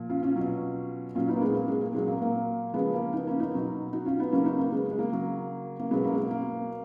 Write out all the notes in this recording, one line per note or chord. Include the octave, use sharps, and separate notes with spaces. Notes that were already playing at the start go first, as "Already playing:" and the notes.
Already playing: A#2 F3
C#4 F4
C#4 F4
B2 F#3
A#2 F#3 C#4 F4
B3 D#4
A#3
G#3 B3
A#3
G#3
A#3
A#2 F#3 G#3
A#3
A#3
C#3 F3 G#3 B3
A#3 C#4
B3 D#4
A#3 C#4
B3 D#4
B2 F#3
D#4 F#4
C#4 F4
B3 D#4
C#3 F#3 A#3 C#4
B3 D#4
A#3 C#4
G#3 B3
G#3
A#3
C#3 F#3
A#3
B2 F#3 G#3 B3
A#3 C#4
G#3
A#3
A#3